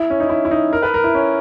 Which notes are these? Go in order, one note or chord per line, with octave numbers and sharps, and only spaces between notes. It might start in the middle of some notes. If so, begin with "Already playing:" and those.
Already playing: E4
C#4
D#4
E4
E4
D#4
A#4
B4
A#4
E4
C#4